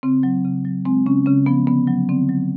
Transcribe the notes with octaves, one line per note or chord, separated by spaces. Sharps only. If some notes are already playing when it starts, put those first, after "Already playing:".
C#3 C4
F#3
C#3
F#3
G#3 C4
C#3 C#4
C#3 C#4
F3 B3
D3 B3
F#3
D3 C4
F#3